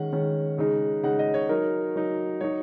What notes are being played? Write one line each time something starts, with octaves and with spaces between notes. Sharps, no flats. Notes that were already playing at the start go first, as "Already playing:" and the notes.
Already playing: D#3 G#3 C#4 F#5
D#3 G#3 C#4
C#3 G#3 D#4
C#3 G#3 D#4 F#5
D#5
C#5
F#3 D#4 A#4
F#3 D#4
F#3 D#4 C#5